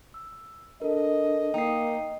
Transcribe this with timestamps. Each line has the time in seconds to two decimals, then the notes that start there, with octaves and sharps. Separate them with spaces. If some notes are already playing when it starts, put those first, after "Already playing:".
0.14 E6
0.82 D4 A4 A#4 D#5
1.54 A#3 D#4 G5 C7